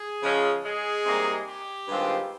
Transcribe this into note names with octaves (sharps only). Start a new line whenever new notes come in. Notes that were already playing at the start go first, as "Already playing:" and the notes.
Already playing: G#4
C#3 F3 G#3 C#4
G#3 G#4
C3 G3 A#3 D#4
G4
G2 D#3 G#3 C4 F4